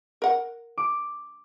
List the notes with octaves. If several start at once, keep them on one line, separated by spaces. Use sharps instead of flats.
A#4 F#5
D6